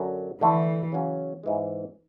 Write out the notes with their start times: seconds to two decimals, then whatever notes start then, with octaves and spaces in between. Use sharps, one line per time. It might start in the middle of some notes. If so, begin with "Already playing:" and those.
Already playing: F#2 D3 F#3
0.41 D3 E3 A3 E4
0.92 C#3 F#3 C#4
1.43 G#2 E3 G#3